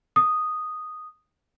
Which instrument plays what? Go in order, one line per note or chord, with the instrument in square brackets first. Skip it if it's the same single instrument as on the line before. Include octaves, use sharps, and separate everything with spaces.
[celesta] D#6